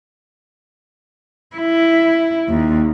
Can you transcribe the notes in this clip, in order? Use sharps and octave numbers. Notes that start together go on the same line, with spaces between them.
E4
D#2